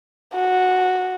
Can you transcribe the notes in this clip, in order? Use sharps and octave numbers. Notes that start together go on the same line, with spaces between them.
F#4